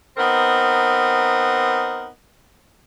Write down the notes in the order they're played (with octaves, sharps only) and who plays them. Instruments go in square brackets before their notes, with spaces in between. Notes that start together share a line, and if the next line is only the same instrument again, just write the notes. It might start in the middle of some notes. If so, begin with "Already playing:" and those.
[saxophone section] B3 C4 D#4 A#4